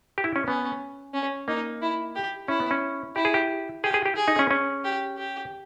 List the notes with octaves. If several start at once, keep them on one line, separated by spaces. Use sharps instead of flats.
G4
E4
C#4
B3 C#4
C#4
A#3 D#4
E4
G4
C#4 E4
B3
C#4
E4 G4
G#4
G4
G4 G#4
G#4
G4
G#4
D#4
C#4
C#4
G4
G4